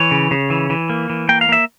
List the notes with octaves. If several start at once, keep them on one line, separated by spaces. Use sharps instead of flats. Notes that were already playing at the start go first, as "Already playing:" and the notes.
Already playing: E3 C#5
C#3
C#3
E3
E3
A#3
E3
A#3 G5
F5
A#3 E5